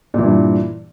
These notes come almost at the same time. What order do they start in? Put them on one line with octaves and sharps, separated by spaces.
A#2 E3 G2